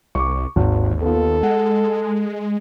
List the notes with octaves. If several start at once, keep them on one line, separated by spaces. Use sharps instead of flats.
C2 C#6 D6
G#1 D#2
B3 F4 A4
G#3 F#5